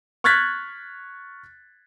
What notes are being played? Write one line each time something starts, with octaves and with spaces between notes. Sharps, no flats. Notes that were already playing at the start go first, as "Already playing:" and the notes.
C#6 F6 F#6 G#6 A6 B6